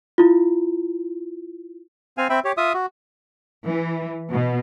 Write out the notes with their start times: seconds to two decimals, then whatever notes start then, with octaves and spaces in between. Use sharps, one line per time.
0.18 E4 F4
2.18 C4 F5 G#5
2.30 C4 E5 G5 B5
2.44 G4 C#5
2.57 F4 E5 D#6
2.74 F#4
3.67 E3
4.30 B2